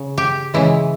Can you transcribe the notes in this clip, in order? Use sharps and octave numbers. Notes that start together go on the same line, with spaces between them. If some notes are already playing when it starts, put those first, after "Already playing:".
Already playing: C#3
G4
C#3 E3 G#3 E4